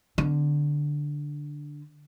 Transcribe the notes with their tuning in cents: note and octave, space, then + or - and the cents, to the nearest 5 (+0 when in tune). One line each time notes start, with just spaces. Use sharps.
D3 +0 C4 -45